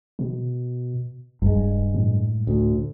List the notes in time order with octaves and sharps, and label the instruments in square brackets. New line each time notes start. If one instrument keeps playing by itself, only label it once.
[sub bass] B2
[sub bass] D#1 [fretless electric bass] G2 G#3
[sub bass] A2
[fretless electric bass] D2